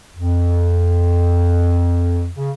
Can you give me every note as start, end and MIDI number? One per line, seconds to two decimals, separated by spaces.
0.16 2.28 41
2.36 2.51 49